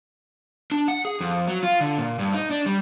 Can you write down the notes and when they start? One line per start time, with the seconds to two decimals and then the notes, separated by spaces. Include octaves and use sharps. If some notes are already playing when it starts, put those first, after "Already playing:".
0.72 D4
0.88 F#5
1.05 G#4
1.20 F2
1.48 F#3
1.63 F4
1.80 D3
1.98 A#2
2.19 G2
2.33 D#4
2.51 D4
2.66 G3